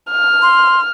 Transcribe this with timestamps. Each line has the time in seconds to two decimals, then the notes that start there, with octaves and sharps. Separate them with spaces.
0.10 F6
0.42 C6